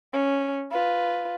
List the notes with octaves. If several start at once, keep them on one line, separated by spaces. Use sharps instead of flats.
C#4
F4 B4